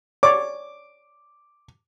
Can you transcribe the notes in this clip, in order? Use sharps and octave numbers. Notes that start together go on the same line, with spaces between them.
C#5 D5 D6